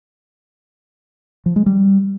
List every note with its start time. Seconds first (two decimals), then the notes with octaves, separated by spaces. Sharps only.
1.46 F3
1.56 G#3
1.66 G3